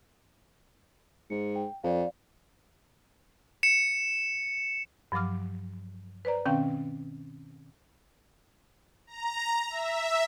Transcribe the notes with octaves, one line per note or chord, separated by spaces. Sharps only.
G#2 C#7
G5
F2 D5 F5
C#7 E7
G2 F3 F#3 D6 F6
B4 C5 D5 A#5
B2 D#3 C4 C#4 F5 G5
A#5
E5